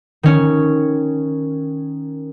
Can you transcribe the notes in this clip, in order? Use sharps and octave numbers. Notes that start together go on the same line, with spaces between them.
D#3 C#4